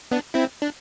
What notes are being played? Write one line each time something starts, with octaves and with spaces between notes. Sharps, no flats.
B3 D4
C4 E4
D4